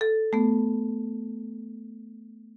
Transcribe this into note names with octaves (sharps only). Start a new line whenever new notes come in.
A4
A3 B3